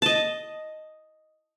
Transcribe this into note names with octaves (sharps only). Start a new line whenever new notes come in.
D#5 A5